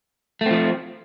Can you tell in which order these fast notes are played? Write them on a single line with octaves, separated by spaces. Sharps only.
A3 C4 F3